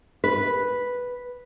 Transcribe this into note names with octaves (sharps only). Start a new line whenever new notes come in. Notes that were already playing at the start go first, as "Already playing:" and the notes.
B4